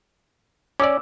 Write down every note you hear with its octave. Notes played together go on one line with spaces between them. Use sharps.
C#4 D5 D6 E6